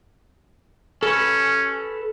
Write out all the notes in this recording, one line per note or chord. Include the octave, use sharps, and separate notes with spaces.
C#4 A4 B4